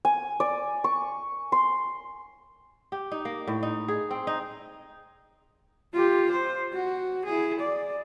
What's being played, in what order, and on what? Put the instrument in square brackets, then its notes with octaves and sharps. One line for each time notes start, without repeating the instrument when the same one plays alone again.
[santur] G#5
D5
C#6
C6
[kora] G4
D#4
A#3
A2
D#4
G#4
C4
D#4
[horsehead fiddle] F4 G4
C5
F#4
E4 G#4
D5